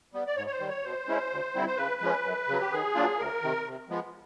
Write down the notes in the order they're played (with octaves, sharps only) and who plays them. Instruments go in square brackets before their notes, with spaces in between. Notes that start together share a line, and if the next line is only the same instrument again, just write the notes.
[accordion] G3 B3
D5
G#2 C#5
C#5
C5
D#3 G3
C#5
B2 C5
G#3 C#4 E4
D2
D3 G3 C4 E4
C5
C#3 B4
F3 G#3 C#4
F#2
C#3 F#3
G4
D#3 G#4
F#3 A#3 D4 F4
D2 A#4
C3 D#3
C3
F3 G#3 B3